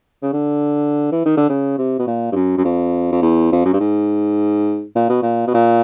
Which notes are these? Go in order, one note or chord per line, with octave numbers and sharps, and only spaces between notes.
C#3
D3
E3
D#3
D3
C#3
C3
B2
A#2
G2
F#2
F#2
F2
F2
E2
F2
F#2
G2
G#2
A#2
B2
A#2
B2
A#2